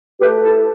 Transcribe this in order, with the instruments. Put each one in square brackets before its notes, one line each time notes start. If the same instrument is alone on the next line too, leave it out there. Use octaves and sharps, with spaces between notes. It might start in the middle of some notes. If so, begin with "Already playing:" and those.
[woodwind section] A3 G4 B4
E4 A4